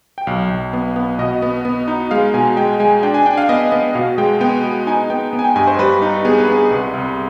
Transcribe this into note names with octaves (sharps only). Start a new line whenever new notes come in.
G5
B1 F5
B1
B3
B3
B2 D#5
B3
B3
D#4
G#3 F5
B2 G#5
G#3 G5
G#3 G#5
D4 G5
G#5
D4 G5
F5
B3 D#5
B3 D#5
B2 F5
G#3 G5
B3 G5
G#3
D#4 G#5
B3 G5
B3
G#5
G5
G2 G#5
C5
G3 B4
D#4
B3 G#4
B4
B3 G#4
C2
C2